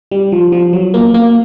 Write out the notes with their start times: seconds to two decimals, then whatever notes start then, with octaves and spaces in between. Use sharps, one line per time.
0.11 G3
0.32 F3
0.52 F3
0.73 F#3
0.94 A#3
1.14 A#3